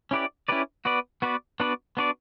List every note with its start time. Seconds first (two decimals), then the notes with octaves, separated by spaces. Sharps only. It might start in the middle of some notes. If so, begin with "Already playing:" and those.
0.11 C#4 E4 G4 B4 D5
0.49 C#4 E4 G4 B4 D5
0.85 B3 F#4 B4 D5
1.22 B3 F#4 B4 D5
1.60 B3 D4 F#4 B4 D5
1.97 B3 D4 F#4 B4 D5